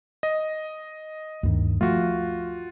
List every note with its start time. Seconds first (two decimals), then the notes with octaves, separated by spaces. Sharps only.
0.23 D#5
1.43 D2 G2 D#3
1.81 F3 A3 F4 F#4